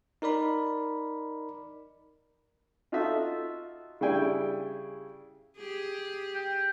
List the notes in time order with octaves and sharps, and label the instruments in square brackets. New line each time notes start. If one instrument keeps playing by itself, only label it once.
[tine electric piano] D#4 A#4 D5 B5
[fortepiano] D#4 F4 F#4 A4 D#5 E5
C#3 G3 D4 E4 G5 G#5
[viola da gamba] G4 G#4
[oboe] G5